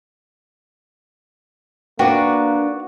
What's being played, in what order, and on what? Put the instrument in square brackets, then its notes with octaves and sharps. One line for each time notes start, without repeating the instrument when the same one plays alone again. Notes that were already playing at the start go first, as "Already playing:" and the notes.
[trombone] A#3 [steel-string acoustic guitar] D4 B4 D5 [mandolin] F#4 [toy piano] G5